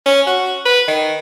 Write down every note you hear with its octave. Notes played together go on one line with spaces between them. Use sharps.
C#4
F#4
B4
D#3